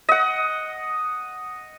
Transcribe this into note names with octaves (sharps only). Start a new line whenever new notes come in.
D#5 F#5